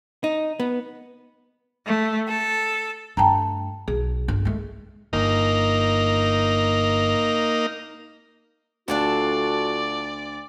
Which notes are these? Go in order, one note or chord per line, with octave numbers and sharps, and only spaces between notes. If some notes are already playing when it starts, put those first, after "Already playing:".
D#4
B3
A3
A4
G2 A3 G5 A5 A#5
B1 G#4
G1
G#3 A3
G1 A#3 D#4
D2 D4 F4 F#4 A4 D5